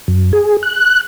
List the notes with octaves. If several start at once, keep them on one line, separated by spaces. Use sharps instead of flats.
F#2
G#4
F#6